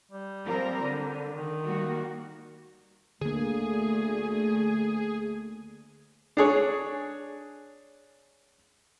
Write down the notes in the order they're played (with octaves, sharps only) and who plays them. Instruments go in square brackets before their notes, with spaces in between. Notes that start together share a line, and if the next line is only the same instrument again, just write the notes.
[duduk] G3
[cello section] F3 C4 A#4
D3
[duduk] D#3
[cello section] G3 A#3 F#4
[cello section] D2 A3 [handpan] D3 A#3 [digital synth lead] G#4
[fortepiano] D4 G#4 C#5